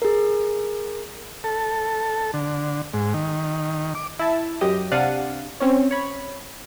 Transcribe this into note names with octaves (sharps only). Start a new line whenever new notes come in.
G#4 A#4
A4
D3
G#2
D#3
D6
E4 E5 A5
F#2 G4 D#5 D#6
C3 D4 F5 F#5 A6 D#7
C4 C#4 C#5
C#5 B5